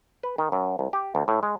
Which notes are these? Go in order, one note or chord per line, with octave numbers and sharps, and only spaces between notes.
B4
D#3
F#2
C2
G4
D2
A2
G#3